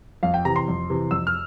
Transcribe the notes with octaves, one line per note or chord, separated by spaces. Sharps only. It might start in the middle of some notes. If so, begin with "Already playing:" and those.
F2 F5
G5
C3 E3 A#5
C6
F2
C3 E3
F2 E6
F6